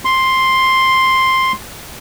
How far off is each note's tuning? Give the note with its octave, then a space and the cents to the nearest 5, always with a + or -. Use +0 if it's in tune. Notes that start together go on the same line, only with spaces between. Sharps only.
C6 +5